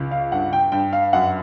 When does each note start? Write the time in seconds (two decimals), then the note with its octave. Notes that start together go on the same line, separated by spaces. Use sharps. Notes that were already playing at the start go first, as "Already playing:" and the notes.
Already playing: C#2
0.11 F5
0.32 G2 F#5
0.53 G5
0.72 G2 G5
0.93 F5
1.13 F#2 F#5